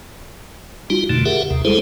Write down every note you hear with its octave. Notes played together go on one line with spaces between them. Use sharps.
G3 D#4 F4 F#4
F2 B2 D3 A3
G4 G#4 A#4 E5 F#5
D#2 C3
G3 G#3 E4 G#4 A4 C5